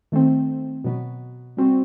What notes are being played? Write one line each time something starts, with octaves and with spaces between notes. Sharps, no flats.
D#3 A3 C4
B2 F#3 B3
G3 C4 F#4